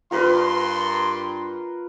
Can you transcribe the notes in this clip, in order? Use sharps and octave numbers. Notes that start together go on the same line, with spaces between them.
G2 F4 A#4 B4 C6